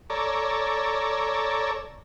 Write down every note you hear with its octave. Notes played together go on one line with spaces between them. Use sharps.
A4 C#5 D5 A#5